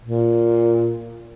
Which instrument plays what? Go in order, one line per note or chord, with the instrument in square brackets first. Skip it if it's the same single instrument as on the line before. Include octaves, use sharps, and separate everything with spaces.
[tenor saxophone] A#2